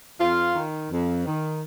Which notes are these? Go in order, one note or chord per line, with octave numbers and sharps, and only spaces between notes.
F2 F4
D#3
F2
D#3